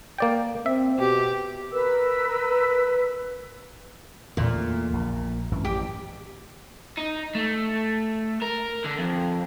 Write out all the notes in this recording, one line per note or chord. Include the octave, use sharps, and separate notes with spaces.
A#3 D5 G5
C4 E5
B2 G4
A#4 B4 E6
E2 A#2 D3 A3
A#1
G#1 F#2 E3
A1 G4
D#4
A3
A#4
D3
F2